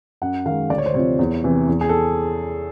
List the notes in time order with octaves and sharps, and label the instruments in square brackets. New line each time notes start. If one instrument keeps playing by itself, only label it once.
[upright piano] F#2 F#5
D#3 G#3 F5
D2 D5
C#5
C5
C3 F3 C#5
E2
C3 E3
E2
G#4
A4